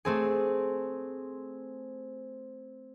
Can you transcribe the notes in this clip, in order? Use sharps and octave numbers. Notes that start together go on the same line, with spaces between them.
A3 C4 G#4